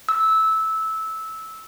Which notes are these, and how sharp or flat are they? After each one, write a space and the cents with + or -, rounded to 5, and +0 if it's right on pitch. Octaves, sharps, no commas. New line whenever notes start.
E6 -15